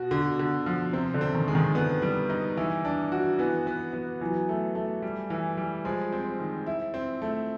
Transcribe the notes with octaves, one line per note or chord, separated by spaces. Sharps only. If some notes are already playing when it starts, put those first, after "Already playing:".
Already playing: B2 F#4
D3
D3
F3
C3 C4
D3
C4
D#3
G#3
D#3
D3 B3
G3
D#4
E3
D4
F#4
E3 B3
B3
B3
E3 F#3
A3
A3
G3
E3
G3
F3 G#3
C4
D#3
E4
C4
A3